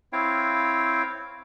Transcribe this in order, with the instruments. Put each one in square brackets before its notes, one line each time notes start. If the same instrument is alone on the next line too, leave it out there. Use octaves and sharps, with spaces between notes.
[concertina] C4 E4 C#5 F5 G5